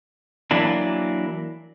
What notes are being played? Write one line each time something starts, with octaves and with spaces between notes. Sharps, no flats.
E3 F#3 A#3 D4